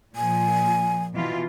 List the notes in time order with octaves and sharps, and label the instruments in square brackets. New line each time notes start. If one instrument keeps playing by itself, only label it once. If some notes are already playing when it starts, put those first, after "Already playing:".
[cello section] A#2 F3 [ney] G#5
[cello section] B2 E3 F4